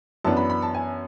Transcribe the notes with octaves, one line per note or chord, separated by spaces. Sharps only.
F#2 E3 B3 D4 A5
B5
B5
A5
G#5